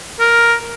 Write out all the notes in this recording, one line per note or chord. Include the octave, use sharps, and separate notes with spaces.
A#4